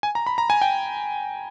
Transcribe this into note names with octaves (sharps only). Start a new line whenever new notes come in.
G#5
A#5
B5
A#5
G#5
G5